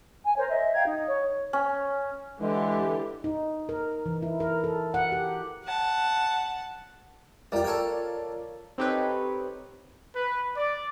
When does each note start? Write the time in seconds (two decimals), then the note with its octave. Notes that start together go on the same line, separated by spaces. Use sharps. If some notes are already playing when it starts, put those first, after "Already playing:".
0.24 G#5
0.37 A#4 C5 C#5
0.49 D#5 E5
0.74 F5 G5 A#5 G#6
0.86 D#4
1.07 C#5
1.53 C#4
2.41 D3 E3 G#3 G4
3.24 D#4
3.69 A#4
4.06 E3
4.22 E4
4.40 A#4
4.64 A4
4.94 F#5
5.12 G4
5.64 F#5 A5
7.52 G3 F4 G4 A#4 D5
7.64 A4 C#5 G5
8.78 C4 D#4 G4 A4 B4 C#5
10.14 B4
10.56 D5